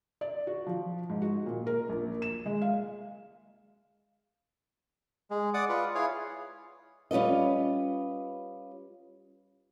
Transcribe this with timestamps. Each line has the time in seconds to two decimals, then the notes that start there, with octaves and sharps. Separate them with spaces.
0.21 D5
0.47 F#4
0.67 F3
1.09 G#2
1.22 F#4
1.46 A#2
1.67 A#4
1.89 A#1
2.22 E7
2.46 G#3
2.62 F5
5.31 G#3
5.54 D5 F#5 D6 D#6
5.69 F4 B4
5.95 E4 G#4 C#5 F5
7.11 G3 C#4 F4 B4 D#5